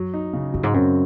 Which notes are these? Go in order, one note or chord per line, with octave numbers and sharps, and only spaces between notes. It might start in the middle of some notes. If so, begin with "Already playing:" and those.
Already playing: F#2 F#3
D#4
C#3
F#2 F#3
G#2
F#2 C4